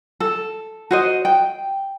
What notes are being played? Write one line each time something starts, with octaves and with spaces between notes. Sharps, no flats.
A4
F#4 C5 D#5
G5